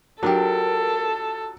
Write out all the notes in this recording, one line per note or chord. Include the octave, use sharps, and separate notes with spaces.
F#3 D4 F4 G4 A4 A#4